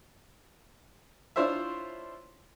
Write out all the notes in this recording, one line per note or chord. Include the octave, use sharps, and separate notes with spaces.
D4 E4 F4 C5 C#5 E5